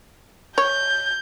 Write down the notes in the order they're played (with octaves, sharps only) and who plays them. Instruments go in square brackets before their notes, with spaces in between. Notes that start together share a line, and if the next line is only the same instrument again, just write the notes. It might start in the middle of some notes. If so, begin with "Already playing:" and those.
[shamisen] C#5 [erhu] G6